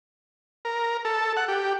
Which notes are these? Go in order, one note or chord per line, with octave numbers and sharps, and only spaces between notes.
A#4
A4
F#5
G4